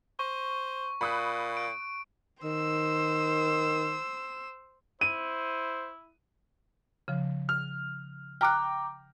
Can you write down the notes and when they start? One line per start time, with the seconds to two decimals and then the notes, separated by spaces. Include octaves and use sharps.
0.19 C5 C#6
1.01 A#2 B5 D#6 F#6
1.57 D7
2.43 D#3 C5 E6
5.01 E4 C5 D#7
7.08 C#3 F3
7.49 F6
8.41 G5 A#5 D6 F6 F#6